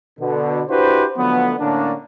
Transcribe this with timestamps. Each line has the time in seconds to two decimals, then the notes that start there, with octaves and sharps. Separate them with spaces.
0.20 B2 D3
0.69 D4 E4 F#4 G4 B4 C5
1.17 D3 F3 F#3 A3 B3
1.59 A2 D3 A#3 C#4 D4